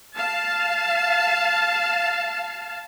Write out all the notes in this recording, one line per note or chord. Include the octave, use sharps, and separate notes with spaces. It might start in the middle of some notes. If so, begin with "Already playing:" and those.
F5 A5